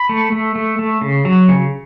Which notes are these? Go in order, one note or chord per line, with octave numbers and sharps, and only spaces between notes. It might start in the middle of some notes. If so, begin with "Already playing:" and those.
Already playing: B5
A3
A3
A3
A3
C#3
F#3
C#3